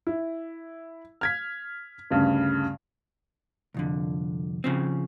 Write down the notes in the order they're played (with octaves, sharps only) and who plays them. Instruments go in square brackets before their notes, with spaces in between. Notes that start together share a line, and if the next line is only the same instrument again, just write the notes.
[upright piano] E4
F6 G#6 B6
D2 G2 C#3
[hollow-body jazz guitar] C2 F2 D3
C#3 F3 C4